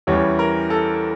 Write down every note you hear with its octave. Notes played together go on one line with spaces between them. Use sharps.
E2 E3 G3 C#4 C#5
A#4
A4